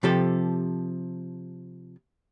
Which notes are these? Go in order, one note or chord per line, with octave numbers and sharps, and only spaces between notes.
C3 F3 G4 A4